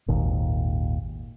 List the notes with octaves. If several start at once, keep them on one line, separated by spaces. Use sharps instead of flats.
G#1 D#2 A#2